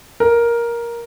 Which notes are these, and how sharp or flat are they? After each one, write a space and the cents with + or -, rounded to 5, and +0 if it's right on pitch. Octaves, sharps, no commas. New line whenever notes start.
A#4 +10